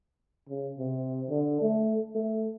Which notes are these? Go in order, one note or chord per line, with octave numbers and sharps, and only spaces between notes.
C#3
C3
D3
A3
A3